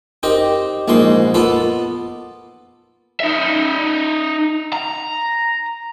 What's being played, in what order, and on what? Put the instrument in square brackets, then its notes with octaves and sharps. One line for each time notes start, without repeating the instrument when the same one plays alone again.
[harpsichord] C4 D#4 G4 A#4
A#1 G#2 A#3 D#4 C6
A#3 B3 F4 A4
[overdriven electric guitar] D#4 E5
A#5